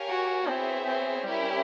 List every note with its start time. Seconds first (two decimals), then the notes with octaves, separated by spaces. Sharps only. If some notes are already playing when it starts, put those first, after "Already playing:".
Already playing: G4 A#4 C#5 F5 G#5
0.09 F#4
0.47 B3 C4 E4 G#4 C#5 E5
0.86 C4
1.23 G3 C#4 E4 G4 A#4